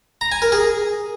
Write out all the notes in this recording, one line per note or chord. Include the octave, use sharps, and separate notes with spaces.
A#5
G#5
A#4
G#4